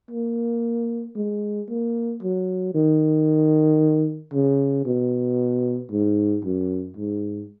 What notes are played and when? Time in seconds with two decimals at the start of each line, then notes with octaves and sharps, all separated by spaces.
0.11 A#3
1.16 G#3
1.69 A#3
2.22 F#3
2.74 D#3
4.33 C#3
4.85 B2
5.91 G#2
6.44 F#2
6.96 G#2